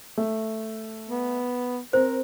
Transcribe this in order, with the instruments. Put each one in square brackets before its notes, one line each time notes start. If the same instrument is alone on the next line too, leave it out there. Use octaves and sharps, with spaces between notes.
[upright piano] A3
[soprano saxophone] B3
[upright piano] C4 [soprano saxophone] A#4 [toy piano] C5